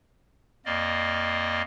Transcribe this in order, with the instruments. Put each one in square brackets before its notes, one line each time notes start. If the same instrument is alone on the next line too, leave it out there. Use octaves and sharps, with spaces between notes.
[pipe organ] F2 A#3 D5 D#5